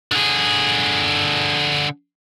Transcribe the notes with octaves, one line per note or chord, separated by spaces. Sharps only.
D3 G#4